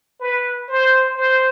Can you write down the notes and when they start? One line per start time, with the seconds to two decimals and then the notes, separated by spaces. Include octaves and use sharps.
0.20 B4
0.68 C5
1.16 C5